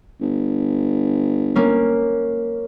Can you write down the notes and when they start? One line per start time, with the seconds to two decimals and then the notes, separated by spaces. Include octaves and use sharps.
0.21 G1
1.56 A#3 C#4